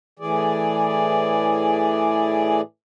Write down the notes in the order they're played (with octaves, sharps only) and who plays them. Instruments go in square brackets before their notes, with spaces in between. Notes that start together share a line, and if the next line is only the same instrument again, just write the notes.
[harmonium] A2 E3 G#4 D5